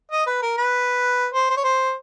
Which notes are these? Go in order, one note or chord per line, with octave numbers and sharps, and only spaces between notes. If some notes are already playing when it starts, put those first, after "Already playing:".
D#5
B4
A#4
B4
C5
C5
C#5
C5